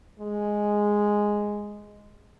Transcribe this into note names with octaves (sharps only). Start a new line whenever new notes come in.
G#3